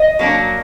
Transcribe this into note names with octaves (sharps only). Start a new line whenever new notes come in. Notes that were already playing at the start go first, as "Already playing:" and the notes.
Already playing: D#5
F#3 A#3 D4